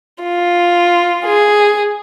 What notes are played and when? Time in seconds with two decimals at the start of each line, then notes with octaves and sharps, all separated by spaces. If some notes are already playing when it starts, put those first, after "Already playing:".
0.24 F4
1.25 G#4